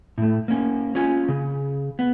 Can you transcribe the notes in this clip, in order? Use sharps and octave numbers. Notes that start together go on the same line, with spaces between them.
A2 A3
A#3 C#4
C#4 F4 G#5
C#3
B3